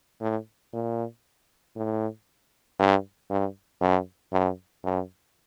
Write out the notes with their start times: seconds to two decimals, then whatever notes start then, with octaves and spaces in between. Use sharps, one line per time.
0.21 A2
0.73 A#2
1.76 A2
2.79 G2
3.30 G2
3.81 F#2
4.33 F#2
4.84 F#2